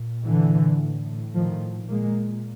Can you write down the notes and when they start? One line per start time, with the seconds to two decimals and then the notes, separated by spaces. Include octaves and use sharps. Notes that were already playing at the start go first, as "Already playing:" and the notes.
Already playing: A#2
0.25 D3 E3
0.80 A2
1.36 D#3 F3
1.90 A#2 G#3 A#3